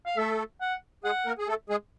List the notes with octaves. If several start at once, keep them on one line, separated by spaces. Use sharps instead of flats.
F5
A3 A4 E5
F#5
G#3 G#4 F#5
A#3 A#4
G#4
A3 A4
G#3 G#4